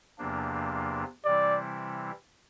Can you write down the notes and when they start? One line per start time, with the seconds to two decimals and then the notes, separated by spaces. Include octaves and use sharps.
0.18 E2 C3 F3 A#3 D4
1.25 C3 E3 G3 C4 E4 D5